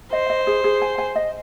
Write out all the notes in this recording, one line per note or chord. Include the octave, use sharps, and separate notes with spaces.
C5 D#5
D#5
G#4
G#4
G#5
G#5
D#5